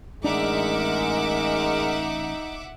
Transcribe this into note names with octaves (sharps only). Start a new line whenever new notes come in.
A1 G#3 D4 D#4 A#4 E5 F#5 D6